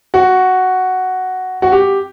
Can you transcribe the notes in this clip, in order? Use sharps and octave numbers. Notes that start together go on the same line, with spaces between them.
F#4
F#4
G4